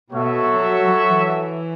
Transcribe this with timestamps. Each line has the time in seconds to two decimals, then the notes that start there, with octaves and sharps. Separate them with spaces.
0.12 B2 F#4 A4 C#5 E5
0.46 F#3
0.81 F#3
1.14 E3